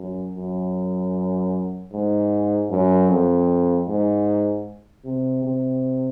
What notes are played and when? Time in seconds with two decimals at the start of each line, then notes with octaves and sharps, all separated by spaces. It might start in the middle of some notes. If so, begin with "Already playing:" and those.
Already playing: F#2
0.35 F#2
1.92 G#2
2.71 F#2
3.09 F2
3.87 G#2
5.05 C3
5.44 C3